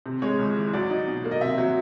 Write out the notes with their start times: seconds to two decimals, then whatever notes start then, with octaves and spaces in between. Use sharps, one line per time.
0.06 C3
0.22 G#3 C#5
0.39 C#2
0.56 E3
0.73 F#3 D5
0.90 D#4
1.07 B2
1.24 A#3
1.31 D#5
1.41 C3 E5
1.58 F#3